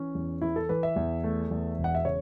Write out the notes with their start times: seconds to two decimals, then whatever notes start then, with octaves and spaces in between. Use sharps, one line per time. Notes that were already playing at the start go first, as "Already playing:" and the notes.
Already playing: E3 C#4
0.15 E2
0.41 E3 E4
0.56 A4
0.69 E3 B4
0.83 E5
0.96 E2
1.24 A3
1.51 E2
1.78 E1
1.84 F#5
1.95 E5
2.05 C#3 C#5